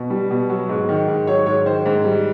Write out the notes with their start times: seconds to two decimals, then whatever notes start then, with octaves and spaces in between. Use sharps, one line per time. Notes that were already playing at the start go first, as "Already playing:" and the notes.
Already playing: B2
0.10 G3
0.31 B2
0.49 F#3
0.69 G#2
0.89 D#3
1.08 G#2
1.27 F#3 C#5
1.46 G#2 C#5
1.66 D#3 C5
1.86 G#2
2.05 G3